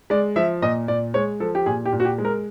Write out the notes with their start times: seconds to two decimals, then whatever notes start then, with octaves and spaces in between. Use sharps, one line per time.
0.10 G#3 D5
0.36 F3 E5
0.62 A#2 D#5
0.88 A#2 D5
1.14 G#3 C#5
1.40 F3 A4
1.55 G4
1.66 A#2 G#4
1.86 G4
1.92 A#2
2.00 F#4
2.05 G4
2.18 G#3
2.25 A#4